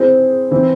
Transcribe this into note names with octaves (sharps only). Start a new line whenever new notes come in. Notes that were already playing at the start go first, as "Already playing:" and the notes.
Already playing: C4 E4 G#4 C5
E3 C4 E4